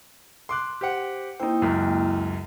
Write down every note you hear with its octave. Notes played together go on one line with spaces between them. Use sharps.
C6 D6 F#6
G4 C5 F#5
A#3 D#4 E4 C5 G5
C#2 F#2